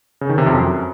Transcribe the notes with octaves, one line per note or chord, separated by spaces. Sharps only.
C#3
D#3
C3
F2
F#2